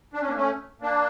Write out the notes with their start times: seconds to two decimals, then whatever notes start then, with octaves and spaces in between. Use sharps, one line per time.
0.13 D4
0.21 C#4
0.28 A#3 D4
0.36 A3 C#4
0.81 A#3 D4